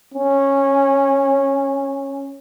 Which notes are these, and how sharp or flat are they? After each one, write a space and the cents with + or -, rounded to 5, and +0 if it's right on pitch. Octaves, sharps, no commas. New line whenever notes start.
C#4 -10